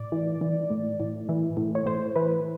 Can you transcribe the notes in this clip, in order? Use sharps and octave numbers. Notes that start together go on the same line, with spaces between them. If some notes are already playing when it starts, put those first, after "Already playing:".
Already playing: A2 D5
E3
E3
A2
A2
E3
A2
C#5
A2 C5
E3 B4